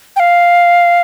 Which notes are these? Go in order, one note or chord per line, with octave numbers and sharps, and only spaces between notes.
G5
F5